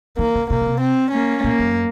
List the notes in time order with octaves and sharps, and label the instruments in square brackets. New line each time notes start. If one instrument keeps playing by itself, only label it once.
[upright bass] D#3 [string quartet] A#3
[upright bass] C#3
[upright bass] C3 [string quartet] A#3
[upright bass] C#3
C3
[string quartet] C4
A#3 C#4
[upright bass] A#2 [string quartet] A#3
[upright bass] F#2